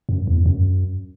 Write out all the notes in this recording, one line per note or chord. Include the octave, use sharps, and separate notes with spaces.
F#2
E2
F#2